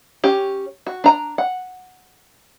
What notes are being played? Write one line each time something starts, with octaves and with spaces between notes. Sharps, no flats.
C#4 G4
F#4
D4 A#5
F#5